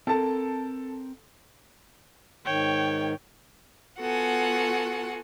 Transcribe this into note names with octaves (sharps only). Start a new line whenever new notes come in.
C4 A4 A#4 A5
G#2 D#3 C#5 G5
B3 F4 F#4 A4 F#5 G#5